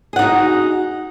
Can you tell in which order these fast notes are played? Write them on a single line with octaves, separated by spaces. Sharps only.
G#4 F#5 D#4 F#4